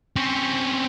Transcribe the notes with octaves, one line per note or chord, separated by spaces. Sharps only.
C4 C#4